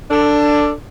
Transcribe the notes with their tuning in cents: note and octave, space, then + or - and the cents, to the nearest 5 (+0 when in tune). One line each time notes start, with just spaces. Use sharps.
D4 +0 A4 +25